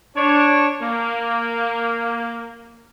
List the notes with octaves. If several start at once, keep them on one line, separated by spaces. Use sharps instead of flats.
D4 C#5
A#3